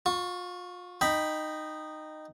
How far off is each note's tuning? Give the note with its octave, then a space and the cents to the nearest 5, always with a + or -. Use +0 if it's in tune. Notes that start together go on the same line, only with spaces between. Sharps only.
F4 +35 C#6 +0
D#4 -10 G5 +0 B5 +0